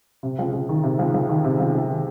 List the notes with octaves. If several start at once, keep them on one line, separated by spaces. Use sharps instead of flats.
C3
C#2
C#2
D#3
C3
C#2
C#2
D#3
C3
C#2
C#2
D#3